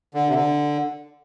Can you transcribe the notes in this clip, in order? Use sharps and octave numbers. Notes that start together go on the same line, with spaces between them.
D3
C3
D3